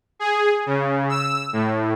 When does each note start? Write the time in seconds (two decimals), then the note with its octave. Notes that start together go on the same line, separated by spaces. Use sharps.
0.19 G#4
0.66 C#3
1.09 E6
1.53 A2